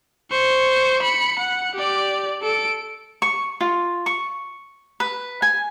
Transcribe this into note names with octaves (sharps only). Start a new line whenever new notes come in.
C5 C#6
B5 C#7
F#5
G4 D5
A4 D7
C#6
F4
C#6
B4
G#5